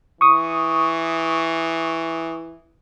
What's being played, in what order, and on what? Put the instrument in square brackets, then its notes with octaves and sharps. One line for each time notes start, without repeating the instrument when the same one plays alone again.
[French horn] E3 [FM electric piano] C#6 D#6